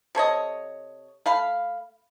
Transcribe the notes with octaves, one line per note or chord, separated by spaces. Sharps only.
C3 A4 C#5 D#5
A3 F5 B5